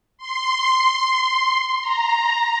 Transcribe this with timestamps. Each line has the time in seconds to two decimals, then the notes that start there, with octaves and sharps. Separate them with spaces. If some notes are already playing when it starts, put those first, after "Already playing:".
0.18 C6
1.82 A#5